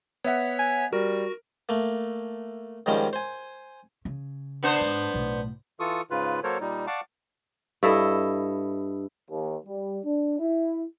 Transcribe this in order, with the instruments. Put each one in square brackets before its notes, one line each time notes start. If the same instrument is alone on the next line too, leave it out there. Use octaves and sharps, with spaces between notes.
[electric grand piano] B3 E5 F#5 [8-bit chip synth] C#5 B6
[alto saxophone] G#5
[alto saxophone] G3 [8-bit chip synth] F#4 [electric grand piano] A#4
[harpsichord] A3 A#3
G#2 D#3 F3 G3 C#4
C5 G#5
[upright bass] C#3
[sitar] B3 D4 C5
[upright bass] G#2
B1 A2
[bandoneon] E3 F4 A4 C#6 D#6
G#2 C#3 F4 B4
F#3 A#3 A4 A#4 C5 C#5
A#2 G3 D#4
D5 F5 F#5 A5 C#6 D6
[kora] G2 E4 A4 D#5
[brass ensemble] D#2
G3
D4
E4